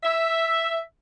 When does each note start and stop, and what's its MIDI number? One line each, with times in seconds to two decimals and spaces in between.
0.04 0.79 76